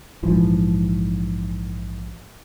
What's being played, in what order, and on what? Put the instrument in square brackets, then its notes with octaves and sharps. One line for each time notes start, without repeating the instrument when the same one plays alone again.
[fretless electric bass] A#1 G#2 E3 F3